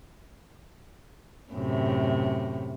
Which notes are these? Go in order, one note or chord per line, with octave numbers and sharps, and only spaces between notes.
F#2 A2 C3